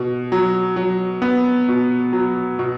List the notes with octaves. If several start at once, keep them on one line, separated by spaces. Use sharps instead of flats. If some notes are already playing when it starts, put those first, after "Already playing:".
Already playing: B2
F#3
F#3
B3
B2
F#3
B2